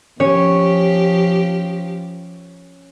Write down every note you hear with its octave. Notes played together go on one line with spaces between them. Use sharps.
F3 C#4 G4 C#5